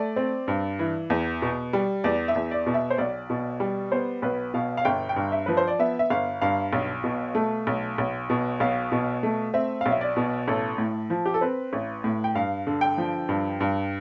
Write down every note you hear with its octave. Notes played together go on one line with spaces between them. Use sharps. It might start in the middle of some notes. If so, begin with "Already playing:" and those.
Already playing: A3 D5
C4
G2
E3
E2
B2
G3
E2 D5
E5
E2
D5
B2
E5
C5
B1 D5
B2
G3
B3 C5
B1 B4
B2 F5
F5
G1 G5
G5
G2
E5
F3 B4
C5
D5
B3 E5
E5
G1 F5
G2 F5
B1
B2
A3
B1
B1
B2
B1 F5
B2
A3
C4 E5
F5
B1
E5
D5
B2
A1 A4
A2
F3
G4
A4
C4 B4
A1
A2
G5
G2 F5
D3
G5
F3
G2
G2